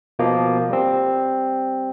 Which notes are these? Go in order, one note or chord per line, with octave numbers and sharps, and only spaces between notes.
B2 F3 A#3
G3 C4